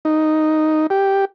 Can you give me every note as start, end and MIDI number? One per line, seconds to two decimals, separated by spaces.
0.05 0.87 63
0.90 1.25 67